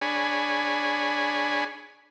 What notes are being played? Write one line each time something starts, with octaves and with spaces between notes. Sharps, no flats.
D4 G#4 C#5 G#5 B5